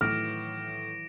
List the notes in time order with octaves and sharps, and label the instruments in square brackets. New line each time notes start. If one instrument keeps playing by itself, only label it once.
[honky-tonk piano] A2 [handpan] D#3 E3 F#3 [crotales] D6 A#6 D7 [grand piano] F6